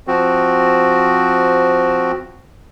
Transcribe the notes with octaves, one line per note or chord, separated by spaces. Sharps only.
F3 C4 F#4